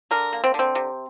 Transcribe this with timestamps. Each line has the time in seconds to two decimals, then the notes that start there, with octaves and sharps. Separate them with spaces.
0.11 D3 A#4
0.33 A#3
0.44 C4
0.54 D3 C4
0.75 C3